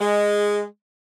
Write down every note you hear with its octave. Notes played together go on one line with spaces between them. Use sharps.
G#3